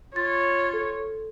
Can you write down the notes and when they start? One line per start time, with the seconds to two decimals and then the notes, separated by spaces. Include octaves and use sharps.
0.16 F4 C#5 A6
0.73 A4